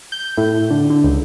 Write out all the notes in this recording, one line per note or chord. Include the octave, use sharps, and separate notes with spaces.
G6
A2
D3
D3
C#2